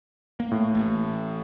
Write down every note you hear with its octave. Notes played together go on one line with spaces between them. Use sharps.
A#3
A2
A1